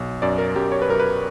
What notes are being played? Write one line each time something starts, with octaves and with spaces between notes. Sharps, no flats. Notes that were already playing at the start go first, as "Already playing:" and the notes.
Already playing: B1
F#2 D5
A#4
F#2 G4
C#5
B4
F#2 A#4
B4